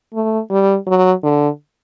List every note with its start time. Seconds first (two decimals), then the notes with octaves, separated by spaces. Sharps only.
0.14 A3
0.50 G3
0.87 F#3
1.23 D3